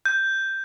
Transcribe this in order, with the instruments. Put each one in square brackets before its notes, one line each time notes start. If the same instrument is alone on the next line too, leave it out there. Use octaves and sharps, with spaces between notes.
[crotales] G6